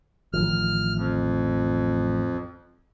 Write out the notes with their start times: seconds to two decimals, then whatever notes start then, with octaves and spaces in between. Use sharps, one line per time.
0.33 A1 D#3 F3 F6
0.96 F2